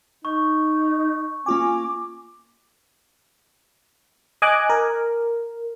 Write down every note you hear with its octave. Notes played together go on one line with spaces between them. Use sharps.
D#4 C#6
A#3 C#4 F4 G#5 D6
D#5 G#5 D6 F#6
A#4